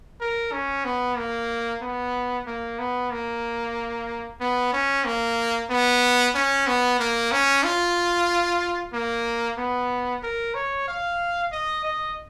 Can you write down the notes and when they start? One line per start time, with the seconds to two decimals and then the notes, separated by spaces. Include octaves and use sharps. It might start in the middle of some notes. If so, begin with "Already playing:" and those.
0.21 A#4
0.52 C#4
0.85 B3
1.17 A#3
1.82 B3
2.47 A#3
2.79 B3
3.11 A#3
4.40 B3
4.73 C#4
5.05 A#3
5.70 B3
6.34 C#4
6.67 B3
6.99 A#3
7.32 C#4
7.64 F4
8.93 A#3
9.58 B3
10.23 A#4
10.55 C#5
10.88 F5
11.52 D#5
11.84 D#5